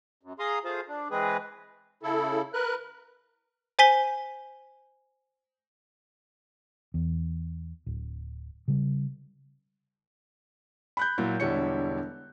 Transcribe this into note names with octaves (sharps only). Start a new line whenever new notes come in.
F#2
G#4 F5 A#5 C6 D#6
A3 F4 G#4 C5 F5
D4
E3 G#3 C4 G#4 B4
C#3 E4 A4
A#4 B4 F#6
C5 G#5 B6 G7
E2
D1
C#3 G3
B5 F#6 G6
A#2 F#3 E4
E1 D3 G3 E4 C#5 C#7